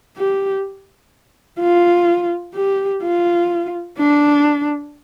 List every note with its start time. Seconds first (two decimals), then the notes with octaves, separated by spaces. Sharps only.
0.17 G4
1.60 F4
2.55 G4
3.03 F4
3.98 D4